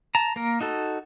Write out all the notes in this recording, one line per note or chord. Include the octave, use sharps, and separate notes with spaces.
A5 A#5
A#3 A#4
D#4 F#4 A4